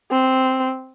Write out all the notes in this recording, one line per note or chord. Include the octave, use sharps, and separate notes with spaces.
C4